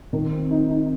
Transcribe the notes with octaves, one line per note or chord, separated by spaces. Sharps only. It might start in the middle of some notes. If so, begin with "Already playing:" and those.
D#3
C4
D#4
D#4